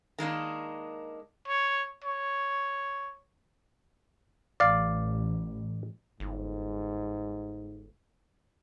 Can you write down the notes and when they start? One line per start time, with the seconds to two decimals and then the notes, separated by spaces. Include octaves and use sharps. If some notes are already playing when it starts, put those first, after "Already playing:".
0.18 D#3 G#3 A#3 D4
1.48 C#5
2.05 C#5
4.60 A1 D5 F5
6.20 G1 G#2